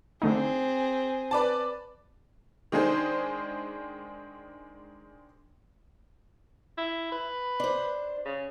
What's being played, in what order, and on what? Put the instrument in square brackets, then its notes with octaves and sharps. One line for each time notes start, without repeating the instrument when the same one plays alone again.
[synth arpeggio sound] D3 A3 D#4 [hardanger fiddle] C4 G#4
[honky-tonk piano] B4 D5 A5
D#3 G#3 D4 G#4 C5
[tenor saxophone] E4
B4
[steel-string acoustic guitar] D4 C5
[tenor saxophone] C#3